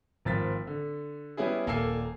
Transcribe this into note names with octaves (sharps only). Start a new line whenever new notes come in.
G#1 F3 A6 B6
D3
G3 B3 C#4 E4 G#4
D#1 A#3 A4 G#5 E6 C7